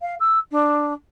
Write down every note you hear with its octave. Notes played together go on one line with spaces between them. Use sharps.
F5
E6
D4